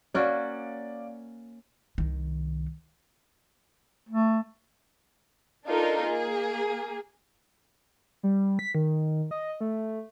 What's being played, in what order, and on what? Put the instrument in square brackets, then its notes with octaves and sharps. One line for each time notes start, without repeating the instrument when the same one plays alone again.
[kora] A#3 C#4 F#4 [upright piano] D5 F5
[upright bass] C2 D#3
[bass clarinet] A3
[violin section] D4 D#4 F4 A4 A#4
A#3 G#4
[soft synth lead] G3
B6
D#3
D#5
A3